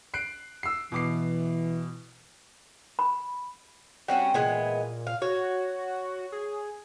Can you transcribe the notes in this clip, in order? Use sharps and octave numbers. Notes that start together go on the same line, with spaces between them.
F#6 C7 D7
E6 C7
B2 E3 D6 C7
B5
G3 C4 C#4 F#4
A#2 E3 G#3 B3
F5
F#4 C#5
G#4